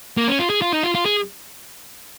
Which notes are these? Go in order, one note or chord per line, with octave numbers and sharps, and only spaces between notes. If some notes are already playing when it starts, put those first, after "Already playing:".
A#3
C#4
F4
G#4
F4
D#4
F4
F4
G#4